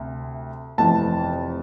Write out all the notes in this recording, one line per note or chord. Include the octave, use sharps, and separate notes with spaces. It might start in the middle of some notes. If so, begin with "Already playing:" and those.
Already playing: D2 C3
F1 F2 E3 A5